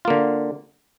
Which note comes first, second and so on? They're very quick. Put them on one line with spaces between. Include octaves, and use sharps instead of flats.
F4 A#3 D3